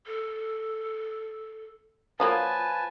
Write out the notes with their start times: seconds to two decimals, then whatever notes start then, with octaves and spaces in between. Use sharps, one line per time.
0.06 A4
2.20 F3 F#3 A#3 F4 B4 G#5 A5